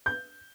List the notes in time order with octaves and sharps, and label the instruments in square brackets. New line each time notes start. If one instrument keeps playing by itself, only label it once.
[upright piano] G6